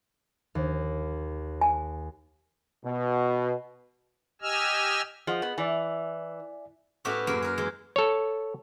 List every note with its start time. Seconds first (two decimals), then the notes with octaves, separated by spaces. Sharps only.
0.55 D#2
1.61 G#5
2.85 B2
4.42 G4 D#5 G#5 E6 F6
5.27 F3 G#4 D#5 F#5
5.42 B3
5.58 E3 D5 E5 G#5
7.05 A2 B3 C#4 F#4 G4 E5
7.27 F#2 A#3 G#4
7.42 G#4 A#4
7.58 E3 G#3
7.96 A4 C#5